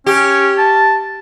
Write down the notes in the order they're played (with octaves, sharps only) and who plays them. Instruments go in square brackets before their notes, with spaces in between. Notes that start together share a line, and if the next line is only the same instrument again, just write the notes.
[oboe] C#4 [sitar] G4
[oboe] A5